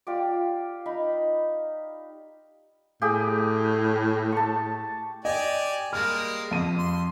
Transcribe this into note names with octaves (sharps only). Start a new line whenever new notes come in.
F4 G4 D5
D#4 B5
A2 G4 G#4 G5
A5 C#6
G4 D5 D#5 G#5
G3 G#3 A#3 F6
F2 D#7
C6